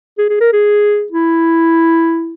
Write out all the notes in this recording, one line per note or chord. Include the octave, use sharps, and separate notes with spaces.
G#4
G#4
A#4
G#4
E4